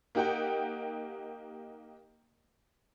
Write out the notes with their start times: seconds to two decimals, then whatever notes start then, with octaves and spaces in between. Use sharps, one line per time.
0.15 A#3 D#4 G4 F#5 G5